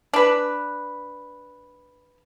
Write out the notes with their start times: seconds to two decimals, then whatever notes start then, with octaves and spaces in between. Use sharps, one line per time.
0.14 D4 B4